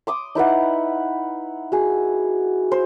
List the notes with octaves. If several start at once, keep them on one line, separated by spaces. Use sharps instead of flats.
C6 D6 D#6
D#4 E4 B4 F#5
F#4 G#4
C5